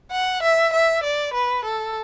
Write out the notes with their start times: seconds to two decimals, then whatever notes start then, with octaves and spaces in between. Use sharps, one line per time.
0.11 F#5
0.42 E5
0.73 E5
1.03 D5
1.34 B4
1.64 A4